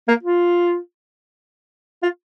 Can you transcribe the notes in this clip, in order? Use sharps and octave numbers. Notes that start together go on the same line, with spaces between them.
A#3
F4
F4